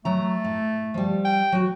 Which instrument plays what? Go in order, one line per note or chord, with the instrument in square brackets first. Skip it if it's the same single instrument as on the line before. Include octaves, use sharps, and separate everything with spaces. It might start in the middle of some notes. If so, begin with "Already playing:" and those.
[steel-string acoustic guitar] F#3 A#5 [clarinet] A3
[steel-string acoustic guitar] A2
F3 G3
[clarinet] G5
[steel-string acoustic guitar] F#3 F#4